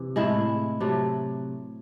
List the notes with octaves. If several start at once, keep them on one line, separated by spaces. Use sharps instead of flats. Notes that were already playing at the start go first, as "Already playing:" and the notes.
Already playing: C3 E3
A2 G#3 E4
C3 F#3 A3